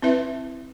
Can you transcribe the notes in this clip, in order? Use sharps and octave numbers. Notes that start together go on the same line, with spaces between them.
C4 E4 B4 E5